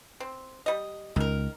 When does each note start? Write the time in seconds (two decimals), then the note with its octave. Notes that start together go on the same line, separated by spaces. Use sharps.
0.20 C4
0.66 G3 D#5
1.16 C#2 D#3 A#4